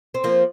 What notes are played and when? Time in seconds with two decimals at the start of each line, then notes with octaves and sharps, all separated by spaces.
0.14 C4
0.24 F3 A#3